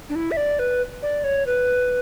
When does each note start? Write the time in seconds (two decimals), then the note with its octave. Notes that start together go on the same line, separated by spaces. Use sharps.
0.09 D4
0.15 E4
0.31 E5
0.37 D5
0.59 B4
1.02 D5
1.24 C#5
1.46 B4